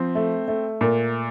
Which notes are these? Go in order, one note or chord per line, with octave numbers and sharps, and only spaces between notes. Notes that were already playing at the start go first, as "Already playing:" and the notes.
Already playing: F3 C4
A3
A3
A#2